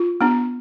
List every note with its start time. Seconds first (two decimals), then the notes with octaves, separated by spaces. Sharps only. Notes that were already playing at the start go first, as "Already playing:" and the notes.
Already playing: F4
0.21 B3 D4